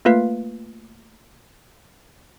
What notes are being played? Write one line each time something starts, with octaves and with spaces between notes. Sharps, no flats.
A3 A#3 F4 B4 F5 B6